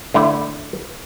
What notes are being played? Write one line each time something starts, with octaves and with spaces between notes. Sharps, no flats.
D3 A3 E4